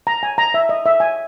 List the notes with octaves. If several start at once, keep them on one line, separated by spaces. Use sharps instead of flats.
A#5
G#5
A#5
E5
D#5
E5
G#5